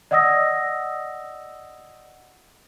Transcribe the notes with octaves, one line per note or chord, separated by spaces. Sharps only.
D5 D#5 F#5 D#6 E6 A#6